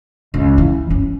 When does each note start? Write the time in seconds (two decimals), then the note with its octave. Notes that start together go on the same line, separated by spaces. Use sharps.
0.34 C#2
0.58 E3
0.90 C#4